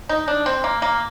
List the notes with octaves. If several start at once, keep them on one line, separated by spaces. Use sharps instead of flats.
D#4
D4
C4
A#3
A#3